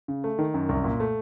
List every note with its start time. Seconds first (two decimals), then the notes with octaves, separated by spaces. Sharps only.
0.08 C#3
0.24 A3
0.39 D#3
0.54 F#2
0.69 C2
0.84 A#2
1.00 A3